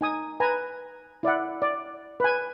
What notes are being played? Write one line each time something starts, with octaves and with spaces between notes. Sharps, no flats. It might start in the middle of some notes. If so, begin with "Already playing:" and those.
D#4 G#5 D#6
B4 G#5 A#5
E4 D5 E5 F#5
D5
B4 G#5